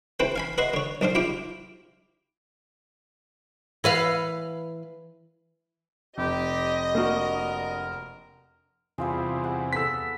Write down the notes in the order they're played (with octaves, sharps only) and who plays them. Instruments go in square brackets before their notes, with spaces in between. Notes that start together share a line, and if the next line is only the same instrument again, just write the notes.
[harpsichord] C4 E4 A4 B4 G5
F5 G#5 B5
B4 D#5 E5 F#5 C6
D3 C#5
B1 D4 C5 F5
E4 F4 G4 G5 D6
[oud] E3 B4 F5
[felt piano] F1 [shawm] G4 [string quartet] D#5
[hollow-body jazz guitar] A#3 D4 F#4 [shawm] A#4
[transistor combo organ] E2 C3 [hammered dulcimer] G3 F4 G#4
[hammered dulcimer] F#5
[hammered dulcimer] B3 A4 [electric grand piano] E6 B6